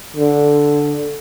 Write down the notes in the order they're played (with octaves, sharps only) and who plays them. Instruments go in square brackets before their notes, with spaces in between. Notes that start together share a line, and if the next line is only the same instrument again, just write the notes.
[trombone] D3